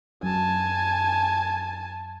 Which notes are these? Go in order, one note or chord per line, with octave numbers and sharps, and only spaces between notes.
F#2 G#5 A5